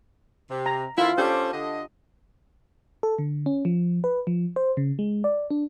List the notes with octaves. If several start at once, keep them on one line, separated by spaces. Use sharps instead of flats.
C3
A#5
D3 D#3 E4 F4
C#4 D4 G4 A4 C5
D3 D#5
A4
D3
C#4
F3
B4
F3
C5
C#3
G#3
D5
D4